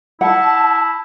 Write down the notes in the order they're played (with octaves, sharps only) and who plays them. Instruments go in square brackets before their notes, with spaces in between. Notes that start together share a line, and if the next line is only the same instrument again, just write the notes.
[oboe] E4 [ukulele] F#5 [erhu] A5